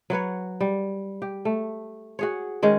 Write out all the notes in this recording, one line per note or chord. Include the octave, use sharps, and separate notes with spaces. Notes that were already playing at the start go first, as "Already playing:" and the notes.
F#3 F#4 B4 C#5
G3
G4
A3
F#4 G#4 C#5
D#3 G#3 C#4